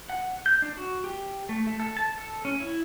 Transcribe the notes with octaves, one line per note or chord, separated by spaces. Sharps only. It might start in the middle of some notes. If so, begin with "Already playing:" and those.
F#5
G6
D4
F#4
G4
A3
A3
A4
A5
A4
C#4
E4